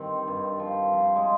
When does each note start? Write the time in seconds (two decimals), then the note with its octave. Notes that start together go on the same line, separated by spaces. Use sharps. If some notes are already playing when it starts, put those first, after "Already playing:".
Already playing: G2 D#3 C4
0.27 G2
0.59 F3
0.93 F3
1.15 G#3